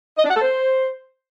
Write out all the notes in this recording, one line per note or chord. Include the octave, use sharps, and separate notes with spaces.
D#5
D4
F#5
A4
C5